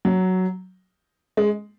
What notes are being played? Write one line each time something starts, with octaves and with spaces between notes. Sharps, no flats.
F#3
G#3